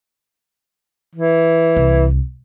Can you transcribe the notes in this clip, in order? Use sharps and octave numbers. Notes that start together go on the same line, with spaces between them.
E3
C2